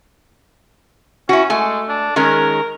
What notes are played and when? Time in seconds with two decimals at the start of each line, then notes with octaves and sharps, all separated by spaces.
1.29 C#4 E4 F#4
1.50 G#3 A3 G#5
1.88 D4
2.16 D#3 G#3 C#4 A#4